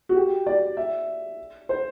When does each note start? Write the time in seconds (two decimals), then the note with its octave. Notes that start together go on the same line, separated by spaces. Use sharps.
0.09 F#4
0.16 G4
0.47 D5
0.77 E5
1.69 C5